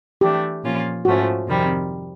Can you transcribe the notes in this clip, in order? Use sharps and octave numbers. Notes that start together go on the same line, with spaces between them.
E3 A3 D4 G4
A#2 F3 A#3 C#4 F4
G#2 F3 A3 C#4 F#4
F2 C3 D#3 G3 C4